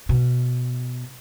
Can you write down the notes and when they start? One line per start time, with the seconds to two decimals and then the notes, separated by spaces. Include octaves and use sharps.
0.09 B2